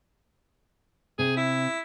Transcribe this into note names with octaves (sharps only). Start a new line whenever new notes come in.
C3 G#4
E4